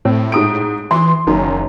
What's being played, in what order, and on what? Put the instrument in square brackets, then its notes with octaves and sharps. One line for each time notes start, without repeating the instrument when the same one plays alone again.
[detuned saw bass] A2 [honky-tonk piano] C4
[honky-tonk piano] G#2 D#6 D7
[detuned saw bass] E3 [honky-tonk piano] C6
[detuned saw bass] F#1 [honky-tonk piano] F#2 D#3